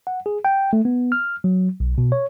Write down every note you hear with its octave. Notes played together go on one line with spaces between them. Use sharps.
F#5
G#4
G5
A3
B3
F6
F#3
B1
B2
C#5